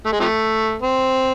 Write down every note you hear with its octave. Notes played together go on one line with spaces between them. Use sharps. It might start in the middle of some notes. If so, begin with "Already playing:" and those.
A3
G#3
C3 F3 A3
C4